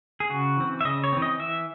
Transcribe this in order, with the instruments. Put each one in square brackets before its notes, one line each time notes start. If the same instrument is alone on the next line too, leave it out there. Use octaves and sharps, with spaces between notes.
[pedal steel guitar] G#4
C#3 F#4
E3 C4
E5
C#3 D#5
C#5
E3 C4
D#5
E3 E5